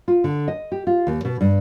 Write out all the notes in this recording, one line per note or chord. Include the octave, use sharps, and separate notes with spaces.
F4
D3
D#5
G4
F4
D#2
B2
G2